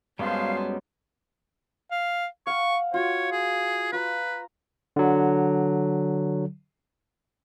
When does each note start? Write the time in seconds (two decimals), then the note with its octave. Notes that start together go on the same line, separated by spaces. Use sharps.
0.19 F#2 G3 G#3 B3 C5 F5 G#5 A5
1.91 F5
2.47 F5 F#5 C#6
2.94 F4 F#4 C#5
3.32 G#4
3.92 F4 B4 A#5
4.96 D3 F#3